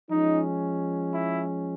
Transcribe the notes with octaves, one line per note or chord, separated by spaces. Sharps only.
F3 G#3 C#4 D#4
E4